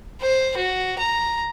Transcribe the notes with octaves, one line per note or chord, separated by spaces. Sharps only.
C5
F#4
A#5